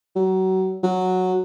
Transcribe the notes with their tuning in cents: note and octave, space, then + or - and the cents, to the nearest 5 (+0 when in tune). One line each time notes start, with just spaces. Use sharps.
F#3 +25
F#3 -5